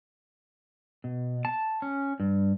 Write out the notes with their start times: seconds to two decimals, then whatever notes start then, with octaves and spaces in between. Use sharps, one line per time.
1.04 B2
1.45 A5
1.82 C#4
2.20 G2